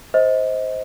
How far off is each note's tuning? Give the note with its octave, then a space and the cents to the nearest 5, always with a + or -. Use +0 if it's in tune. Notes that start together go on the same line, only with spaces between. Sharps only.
C5 +0 D#5 +30